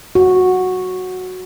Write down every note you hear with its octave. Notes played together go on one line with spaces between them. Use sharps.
F#4